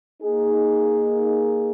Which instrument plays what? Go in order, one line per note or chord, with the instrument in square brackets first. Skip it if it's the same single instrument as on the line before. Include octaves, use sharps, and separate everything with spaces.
[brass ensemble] A#3 D#4 G#4